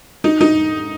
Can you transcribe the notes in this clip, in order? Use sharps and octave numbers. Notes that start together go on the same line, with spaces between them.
D#4
D#4